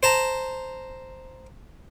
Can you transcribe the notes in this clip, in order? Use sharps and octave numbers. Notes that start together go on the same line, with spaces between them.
C5 A5 A#5